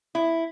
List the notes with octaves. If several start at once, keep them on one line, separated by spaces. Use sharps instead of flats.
E4